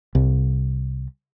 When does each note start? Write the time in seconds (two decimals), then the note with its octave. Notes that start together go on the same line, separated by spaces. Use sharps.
0.15 C2